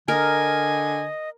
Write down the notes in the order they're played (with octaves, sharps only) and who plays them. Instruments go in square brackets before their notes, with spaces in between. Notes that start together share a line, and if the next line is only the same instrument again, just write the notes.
[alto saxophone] D3 [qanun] A#4 [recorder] D#5 [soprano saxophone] G#5